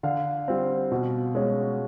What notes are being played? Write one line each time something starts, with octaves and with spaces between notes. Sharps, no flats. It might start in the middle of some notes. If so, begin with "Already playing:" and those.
D3 F5
G3 C4
B2
G#3 C#4